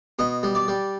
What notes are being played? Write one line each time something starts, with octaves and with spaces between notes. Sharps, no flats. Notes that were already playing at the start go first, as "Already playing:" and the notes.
B2 D#5
G3
D5
G3